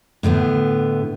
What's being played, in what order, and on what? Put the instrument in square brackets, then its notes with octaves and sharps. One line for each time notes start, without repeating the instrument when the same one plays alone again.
[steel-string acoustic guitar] A2 D3 A3 B3